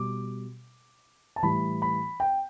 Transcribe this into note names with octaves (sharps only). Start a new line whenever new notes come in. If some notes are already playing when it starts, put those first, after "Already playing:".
Already playing: B2 G3 D6
A5
A2 E3 G3 B5
B5
G5